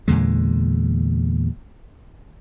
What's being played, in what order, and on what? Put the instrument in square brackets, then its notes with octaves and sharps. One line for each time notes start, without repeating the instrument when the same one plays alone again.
[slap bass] E2 A#2 D3 G#3